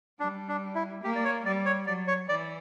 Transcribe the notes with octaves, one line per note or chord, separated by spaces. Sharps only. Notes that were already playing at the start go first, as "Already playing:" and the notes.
G3 D4
D4
E4
A#3 G4
D5
C#5
G3 D5
C#5
F#3 D5
C#5
E3 D5